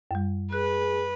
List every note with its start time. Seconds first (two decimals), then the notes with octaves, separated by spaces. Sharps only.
0.11 F#2 G3
0.53 G#4 B4 F#6